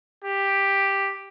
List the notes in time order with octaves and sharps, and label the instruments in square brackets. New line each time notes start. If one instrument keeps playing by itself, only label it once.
[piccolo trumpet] G4